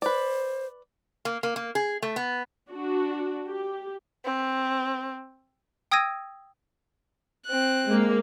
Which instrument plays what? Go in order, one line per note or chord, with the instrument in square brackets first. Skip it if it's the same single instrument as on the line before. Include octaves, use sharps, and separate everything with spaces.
[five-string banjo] B4 D5 [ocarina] C5
[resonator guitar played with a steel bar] A#3
A#3
A#3
G#4
A3
B3
[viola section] D4 F#4
G4
[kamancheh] C4
[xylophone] G5 D#6 E6 G#6 A#6 D#7
[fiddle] C4 F#6
[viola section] G#3 A#3